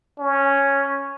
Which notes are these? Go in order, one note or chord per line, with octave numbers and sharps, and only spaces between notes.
C#4